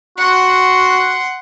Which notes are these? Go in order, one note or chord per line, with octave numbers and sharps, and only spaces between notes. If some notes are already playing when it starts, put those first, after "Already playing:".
F#4 F#5 C6